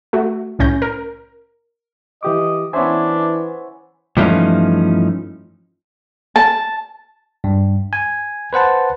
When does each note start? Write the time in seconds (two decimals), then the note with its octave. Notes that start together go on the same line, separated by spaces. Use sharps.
0.13 A3 F#4
0.59 C2 A2 C#4 G6 A#6
0.82 A#4
2.23 E3 G4 D#5 D6
2.73 E3 B3 C#4 D4 C5 E5 G#5
4.17 G2 E3 F3 A3 C#4 D#4
6.36 A5
7.44 G2
7.93 G#5
8.53 B4 C5 F#5 A5